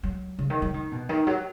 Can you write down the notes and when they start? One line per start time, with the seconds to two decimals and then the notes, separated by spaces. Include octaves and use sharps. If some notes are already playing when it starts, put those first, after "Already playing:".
0.03 F#3
0.39 C#3
0.50 D#3
0.62 F#3
0.74 D#3
0.92 B2
1.09 D#3
1.27 F#3